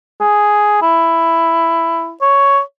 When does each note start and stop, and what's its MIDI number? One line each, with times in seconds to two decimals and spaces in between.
0.21 0.80 68
0.82 2.12 64
2.21 2.60 73